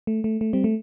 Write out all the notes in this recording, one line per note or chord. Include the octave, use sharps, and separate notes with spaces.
A3
A3
A3
G3 C4
A3